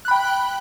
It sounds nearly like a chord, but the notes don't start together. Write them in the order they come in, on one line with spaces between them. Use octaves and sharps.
F#6 B5 G5